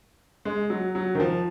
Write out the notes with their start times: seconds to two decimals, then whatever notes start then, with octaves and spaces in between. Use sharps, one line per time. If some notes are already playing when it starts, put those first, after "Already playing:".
0.45 G#3
0.70 F#3
0.95 F#3
1.15 D#3
1.20 F3